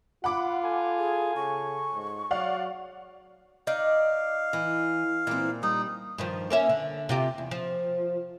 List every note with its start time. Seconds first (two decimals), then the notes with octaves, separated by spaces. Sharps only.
0.24 F4 F#5 B5 D6
0.65 A4 G#5
0.99 G#4
1.36 C#3 C#6
1.94 G#2
2.31 F#3 D5 F5 F#5
3.67 D#4 D5 F5
4.53 E3
5.27 A#2 E3 C4
5.63 G3 D#4
6.18 G2 D#3 F3
6.50 A#3 C#4 E5
6.69 D3
7.09 C3 F4 G4
7.38 E2
7.51 F3